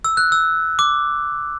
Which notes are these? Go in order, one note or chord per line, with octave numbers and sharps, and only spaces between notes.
E6
F#6
E6
D6